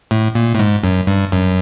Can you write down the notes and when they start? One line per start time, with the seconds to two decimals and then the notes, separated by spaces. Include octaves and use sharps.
0.11 A2
0.35 A#2
0.54 A2
0.59 G#2
0.84 F#2
1.07 G2
1.32 F#2